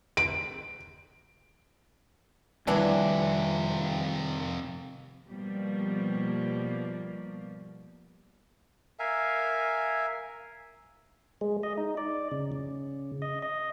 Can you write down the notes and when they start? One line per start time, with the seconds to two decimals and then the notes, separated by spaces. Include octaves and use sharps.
0.17 D7
2.67 F2 C3 D#3 E3 F#3 G3 C4 D4
5.29 B2 F3 G3 A#3
8.99 A#4 E5 F5 G#5
11.41 G#3
11.63 D#5
11.78 D#4
11.97 D5
12.31 C#3
12.52 C#3
13.22 D#5
13.42 D#5